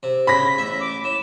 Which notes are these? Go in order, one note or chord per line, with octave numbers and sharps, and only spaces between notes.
C3
C#3 B5 A#6 B6
A1 E5
D6
A2 E7